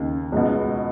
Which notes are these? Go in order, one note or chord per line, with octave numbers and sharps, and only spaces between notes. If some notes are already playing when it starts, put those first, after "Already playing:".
Already playing: D#2 C#3
C#2 B2